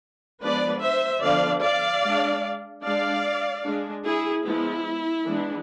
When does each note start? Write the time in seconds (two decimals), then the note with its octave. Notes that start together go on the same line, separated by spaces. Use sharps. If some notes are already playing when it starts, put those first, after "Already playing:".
0.41 F3 G#3 B3 D4 B4 D5
0.81 C5 E5
1.22 D3 F3 B3 D4 D5 F5
1.62 D5 F5
2.03 G#3 D4
2.83 G#3 D4 D5 F5
3.64 G#3 D4
4.04 E4 G#4
4.44 F3 G#3 B3 E4
5.25 E3 G#3 B3 D4